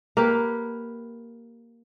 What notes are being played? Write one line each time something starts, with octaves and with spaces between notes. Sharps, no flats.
A#3 G4 B4